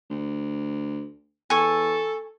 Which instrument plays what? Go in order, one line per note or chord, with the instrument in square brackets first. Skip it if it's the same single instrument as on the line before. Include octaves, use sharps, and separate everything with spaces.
[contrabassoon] D2
[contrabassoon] E2 [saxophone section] A4 [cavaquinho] G#5 C#6